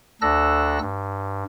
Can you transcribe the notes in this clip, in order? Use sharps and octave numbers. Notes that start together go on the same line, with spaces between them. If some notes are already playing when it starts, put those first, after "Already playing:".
D2 D4 A4 E6 F#6 A#6
G2